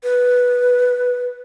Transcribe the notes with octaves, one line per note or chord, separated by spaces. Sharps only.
B4